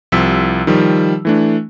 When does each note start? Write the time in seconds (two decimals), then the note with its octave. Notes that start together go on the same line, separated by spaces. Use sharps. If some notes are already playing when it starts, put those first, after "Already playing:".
0.12 C2 C3 F3 E6 B6
0.67 D#3 F3 G3
1.25 E3 A3 D4